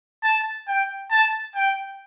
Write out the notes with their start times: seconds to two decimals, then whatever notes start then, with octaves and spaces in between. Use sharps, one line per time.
0.23 A5
0.68 G5
1.11 A5
1.55 G5